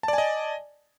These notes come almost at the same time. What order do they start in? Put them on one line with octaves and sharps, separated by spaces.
A5 D5 G#5 D#5